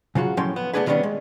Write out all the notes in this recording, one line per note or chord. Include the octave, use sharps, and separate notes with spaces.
C#3 F#3 F4 F#4
A2 F3 F#3 C#4 G5 C6
B3
A3 B3 C#4 D4 G#4 B4
D3 D#3 G3 B3 C#4 D4
G#3